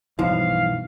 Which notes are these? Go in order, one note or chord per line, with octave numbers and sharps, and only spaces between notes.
B1 G2 E3 F3 F5